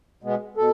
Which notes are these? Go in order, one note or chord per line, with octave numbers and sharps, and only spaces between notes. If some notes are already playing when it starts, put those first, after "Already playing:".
B2 G#3 B3
B2 A4